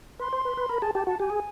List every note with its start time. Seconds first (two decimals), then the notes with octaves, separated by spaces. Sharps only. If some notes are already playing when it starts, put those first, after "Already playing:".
0.20 B4 C6
0.33 C5
0.45 B4
0.57 B4
0.69 A#4 B5
0.82 G#4 A5
0.95 G4 A5
1.07 F#4 A5
1.20 G4 G#5
1.30 G#4